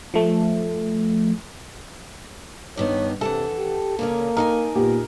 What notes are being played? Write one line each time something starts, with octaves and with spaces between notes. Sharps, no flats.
F3 A3
G2 D#3 B3 C#5
C3 E3 A4 F#5 A5
G4
A#2 C#3 A#3 C#4
D#4 A#4 F#5 G#5
A#2 B3 G4